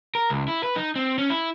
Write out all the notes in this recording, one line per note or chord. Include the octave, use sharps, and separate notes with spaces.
A#4
C#2
E4
B4
D#4
C4
C#4
E4